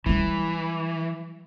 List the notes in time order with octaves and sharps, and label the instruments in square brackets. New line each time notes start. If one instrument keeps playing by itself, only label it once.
[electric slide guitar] E3 [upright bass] F#3 G3